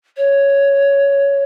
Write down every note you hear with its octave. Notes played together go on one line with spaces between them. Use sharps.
C#5